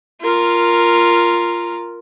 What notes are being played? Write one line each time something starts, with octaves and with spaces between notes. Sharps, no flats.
F4 A#4